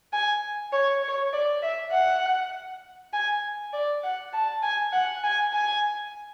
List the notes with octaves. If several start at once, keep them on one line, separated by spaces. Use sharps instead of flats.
G#5
C#5
C#5
D5
E5
F#5
G#5
D5
F#5
A5
G#5
F#5
G#5
G#5